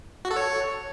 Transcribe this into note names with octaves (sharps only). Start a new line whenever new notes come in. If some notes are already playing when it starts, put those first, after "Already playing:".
F#4
A4
C#5